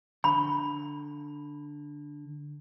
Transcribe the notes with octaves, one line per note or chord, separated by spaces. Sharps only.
D3 B5